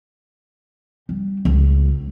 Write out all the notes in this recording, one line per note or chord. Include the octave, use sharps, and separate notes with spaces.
G3
C#2